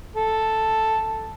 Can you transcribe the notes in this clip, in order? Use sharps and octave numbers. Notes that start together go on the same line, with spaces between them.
A4